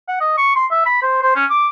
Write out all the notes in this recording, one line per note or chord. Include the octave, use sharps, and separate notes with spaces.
F#5
D#5
C#6
C6
E5
B5
C5
C5
C#4
D6